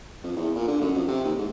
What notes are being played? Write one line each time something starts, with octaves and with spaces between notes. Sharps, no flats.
F2
E2
A#2
D3
F#2
F2
C3
D#2
G#2